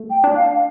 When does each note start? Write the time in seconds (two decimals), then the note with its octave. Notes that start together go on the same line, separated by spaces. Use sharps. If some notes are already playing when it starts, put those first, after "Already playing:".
Already playing: A3
0.10 G5
0.24 D4
0.36 F5